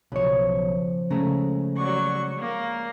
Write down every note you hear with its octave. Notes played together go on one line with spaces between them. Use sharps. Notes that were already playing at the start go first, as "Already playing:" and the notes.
B1 C#3 F3 C#5
C#3 G#3 A3 G#4 A#5
F#3 G#4 D5 F#5 C#6
A#3